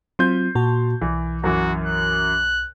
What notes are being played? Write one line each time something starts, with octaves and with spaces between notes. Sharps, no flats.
F#3 C4 F4 C6 G6
A#2 F#4 A5
B1 E3
F#2 E3 F#4
F#6